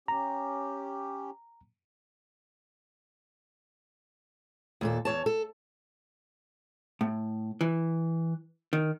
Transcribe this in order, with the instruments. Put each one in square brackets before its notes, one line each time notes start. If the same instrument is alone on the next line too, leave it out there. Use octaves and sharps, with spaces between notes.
[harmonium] C#4 G4 [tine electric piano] A#5
[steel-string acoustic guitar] D#2 A#2 A4
E2 C#3 C#5 A5
A4
[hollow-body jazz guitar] A2
E3
D#3